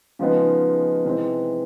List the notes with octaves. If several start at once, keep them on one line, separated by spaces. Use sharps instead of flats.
C#3 F3 G#3 B3 D#4
C3 E3 G#3 C4